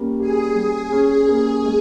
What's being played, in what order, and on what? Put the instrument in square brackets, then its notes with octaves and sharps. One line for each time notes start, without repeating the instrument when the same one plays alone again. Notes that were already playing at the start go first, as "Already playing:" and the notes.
Already playing: [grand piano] G3 A#3 C#4
[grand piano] G4 [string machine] G#4
[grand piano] G3
C#4
A#3
G#3